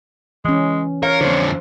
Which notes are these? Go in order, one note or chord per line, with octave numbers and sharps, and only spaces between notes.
E3 G#3 C#4
A#4 C#5 F5
F2 D3 C5